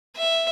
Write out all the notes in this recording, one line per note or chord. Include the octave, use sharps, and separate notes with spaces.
E5